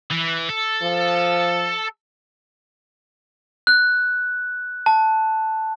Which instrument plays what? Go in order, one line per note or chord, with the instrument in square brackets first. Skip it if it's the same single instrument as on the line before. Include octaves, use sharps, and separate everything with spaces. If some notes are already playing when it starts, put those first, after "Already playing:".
[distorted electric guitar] E3
A4
[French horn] F3
[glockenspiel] F#6
A5